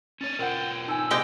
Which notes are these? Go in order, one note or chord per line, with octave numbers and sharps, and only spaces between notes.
C#4 D4 C#5 A6
B2 F4 A#4 C5 C#5 F#5 G5
D#4 G#5 E6
C3 G#3 G5 D6